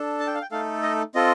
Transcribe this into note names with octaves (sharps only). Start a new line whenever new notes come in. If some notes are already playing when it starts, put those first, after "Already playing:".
Already playing: D4 A4
A5
G5
F5
G5
A3 D#4 A4 F5
D#5
C4 F4 A4 D#5